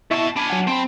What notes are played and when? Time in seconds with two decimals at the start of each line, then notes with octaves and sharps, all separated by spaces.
0.11 B2 E4 E5 A5 C#6
0.36 D4 G#5 B5
0.50 F#3 F#5
0.67 C4 A5 B5